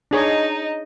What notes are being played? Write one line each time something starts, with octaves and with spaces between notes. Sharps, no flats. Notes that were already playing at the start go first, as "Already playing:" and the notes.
D4 D#4 G#4 C#5 D#5